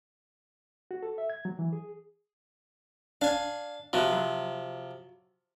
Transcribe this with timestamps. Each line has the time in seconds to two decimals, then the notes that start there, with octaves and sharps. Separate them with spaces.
0.91 F#4
1.03 A4
1.18 E5
1.30 G#6
1.45 F#3
1.59 E3
1.73 G#4
3.21 D4 F5 G#5
3.93 C3 F3 B3 F#4
4.12 F#3